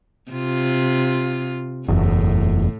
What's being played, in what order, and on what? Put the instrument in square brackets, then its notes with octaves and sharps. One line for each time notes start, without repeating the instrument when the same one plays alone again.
[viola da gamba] C3 F4
[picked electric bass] F#1 E2 [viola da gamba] A2